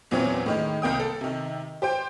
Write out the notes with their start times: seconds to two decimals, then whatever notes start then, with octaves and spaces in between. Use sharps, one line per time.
0.11 E2 A#2 E3 F#3 C4 C#4
0.46 A2 D#3 G#3
0.82 C2 A#3 G5 D#6
0.99 A4
1.21 C3 D#3
1.82 G4 C5 G5